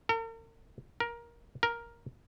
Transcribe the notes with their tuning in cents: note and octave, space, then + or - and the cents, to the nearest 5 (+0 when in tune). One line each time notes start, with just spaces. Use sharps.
A#4 -45
A#4 +15
A#4 +5